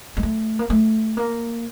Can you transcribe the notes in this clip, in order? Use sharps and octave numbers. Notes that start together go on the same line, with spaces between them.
G#3
A3
A#3
A3
A#3